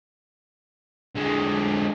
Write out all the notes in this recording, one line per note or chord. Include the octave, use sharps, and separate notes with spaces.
D3 G#3